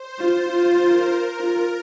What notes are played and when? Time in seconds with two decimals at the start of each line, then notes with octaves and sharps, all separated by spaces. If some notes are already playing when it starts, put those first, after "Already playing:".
Already playing: C5
0.19 F4
0.49 F4 C5
0.79 A#4
1.09 A#4
1.39 F4